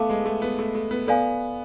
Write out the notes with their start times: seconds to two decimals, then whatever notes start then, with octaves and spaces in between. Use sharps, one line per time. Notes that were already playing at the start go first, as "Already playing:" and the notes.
Already playing: A3 B3 B4 F5 A5 D6
0.10 G#3
0.25 A3
0.42 B3
0.59 A3
0.75 A3
0.91 B3
1.07 B3 A4 D5 F5 G#5